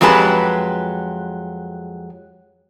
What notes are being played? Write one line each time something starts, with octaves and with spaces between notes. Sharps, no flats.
F2 F#3 G#3 G4 B4 A5